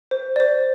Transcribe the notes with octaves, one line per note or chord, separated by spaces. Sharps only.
C5
D5
C5